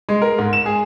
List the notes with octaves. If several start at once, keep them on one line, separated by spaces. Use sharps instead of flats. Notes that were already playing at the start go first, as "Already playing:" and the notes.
G#3
A#4
G#2
E7
G#4